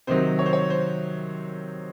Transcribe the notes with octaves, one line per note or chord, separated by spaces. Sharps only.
C3 D#3 F#3 C5
C#5
C5
C#5
C5